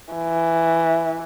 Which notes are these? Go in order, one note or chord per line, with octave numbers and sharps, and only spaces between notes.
E3